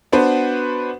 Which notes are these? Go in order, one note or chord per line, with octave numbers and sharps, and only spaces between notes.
B3 D4 F#4 B4 C5